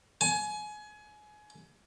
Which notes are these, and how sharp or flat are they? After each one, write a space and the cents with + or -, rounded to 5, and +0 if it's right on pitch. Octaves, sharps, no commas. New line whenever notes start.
G#5 +25